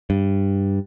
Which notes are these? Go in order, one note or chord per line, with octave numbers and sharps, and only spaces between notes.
G2